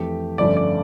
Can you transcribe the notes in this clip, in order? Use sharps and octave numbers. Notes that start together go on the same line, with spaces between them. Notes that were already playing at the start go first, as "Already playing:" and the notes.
Already playing: F2 E3 A3 G4
G1 G2 F3 A3 C#4 D5
D5